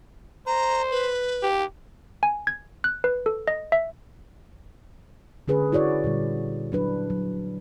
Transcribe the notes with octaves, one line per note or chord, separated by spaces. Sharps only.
C5 A#5
B4
G4
G#5
G#6
F#6
B4
A4
D#5
E5
D3 C#4 G#4 B4
E4 F#4 C#5 D5
A#2 D3 G3
F#3 D4 B4
F#3